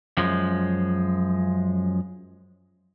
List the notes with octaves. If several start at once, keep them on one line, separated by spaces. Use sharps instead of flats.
F#2 F3 G#3